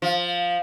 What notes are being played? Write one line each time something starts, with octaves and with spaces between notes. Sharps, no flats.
F3